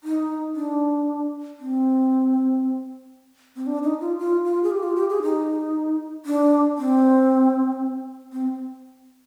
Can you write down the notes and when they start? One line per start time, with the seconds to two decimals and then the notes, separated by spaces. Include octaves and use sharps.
0.04 D#4
0.55 D4
1.60 C4
3.56 C4
3.66 D4
3.83 D#4
4.01 F4
4.19 F4
4.45 F4
4.63 G#4
4.71 G4
4.83 F4
4.96 G4
5.10 G#4
5.23 D#4
6.25 D4
6.78 C4
8.32 C4